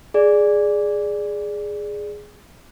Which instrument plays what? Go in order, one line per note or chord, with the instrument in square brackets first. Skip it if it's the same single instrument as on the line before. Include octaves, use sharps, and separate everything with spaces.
[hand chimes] G#4 D5